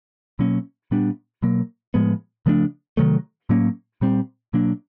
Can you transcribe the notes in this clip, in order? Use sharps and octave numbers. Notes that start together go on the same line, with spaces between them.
B2 F#3 A#3 C#4
A#2 G3 B3 D4
B2 F#3 A#3
A2 F3 G#3 B3
C#3 F3 A3 D4
C3 D#3 F#3 A3
A2 F#3 A#3 C#4
A#2 G3 C4
B2 F#3 A#3 D4